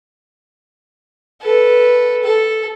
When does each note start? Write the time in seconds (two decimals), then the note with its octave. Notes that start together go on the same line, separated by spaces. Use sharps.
1.41 A4 B4
2.23 A4